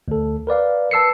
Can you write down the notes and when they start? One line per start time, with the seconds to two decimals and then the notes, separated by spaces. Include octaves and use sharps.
0.08 D2 A4
0.47 A#4 B4 D5 F5
0.91 B4 A5 E6 C7 C#7